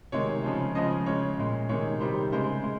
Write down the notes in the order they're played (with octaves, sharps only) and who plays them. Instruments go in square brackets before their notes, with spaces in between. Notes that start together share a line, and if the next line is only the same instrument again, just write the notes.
[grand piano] C3 D#3 G#3 C#5
C#3 F3 G#3
C#3 F3 G#3 D#5
C#3 G#3 C#5
A#2 G#3
C3 D#3 G#3 C#5
C3 D#3 G3 C5
C#3 G#3 C5
G#3